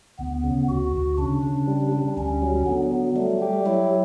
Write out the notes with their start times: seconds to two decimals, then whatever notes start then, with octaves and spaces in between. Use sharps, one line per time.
0.19 D2 B3
0.44 C#3
0.68 D2 F#4
0.94 D2
1.18 C#3 D4
1.43 C#3
1.67 G3
1.92 G3
2.17 D2 C#4
2.42 F#3
2.67 D3 B3
2.91 F#3
3.16 G3 A3
3.42 G4
3.66 F#3 E4